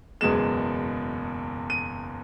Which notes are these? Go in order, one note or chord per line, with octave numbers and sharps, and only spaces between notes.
F#1 E2 B2 G#3 E7
D#7